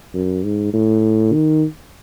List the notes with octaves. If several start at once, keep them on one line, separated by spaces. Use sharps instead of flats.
F#2
G#2
A2
D#3